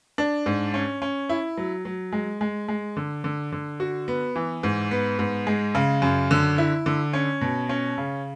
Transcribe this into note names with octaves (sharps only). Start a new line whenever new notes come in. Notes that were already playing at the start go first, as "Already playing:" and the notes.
D4
G#2
C#4
C#4
E4
F#3
F#3
G#3
G#3
G#3
D3
D3
D3
F#4
B3
E3
G#2
B3
G#2
G#3
C#3
F#2
D3
E4
D3
C#4
B2
C#4
C#3